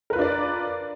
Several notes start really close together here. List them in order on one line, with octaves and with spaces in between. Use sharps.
A#4 B4 F4 D4 D5